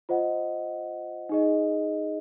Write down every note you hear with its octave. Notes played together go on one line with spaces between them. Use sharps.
F4 C5 D#5 F#5
D#4 G#4 D#5